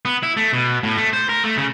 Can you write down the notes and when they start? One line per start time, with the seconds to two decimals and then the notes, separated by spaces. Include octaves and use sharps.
0.05 B3
0.23 E4
0.37 A3
0.53 B2
0.83 A2
0.97 A3
1.13 C5
1.29 A#4
1.44 A3
1.57 C#3